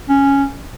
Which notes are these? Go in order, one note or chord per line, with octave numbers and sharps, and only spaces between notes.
C#4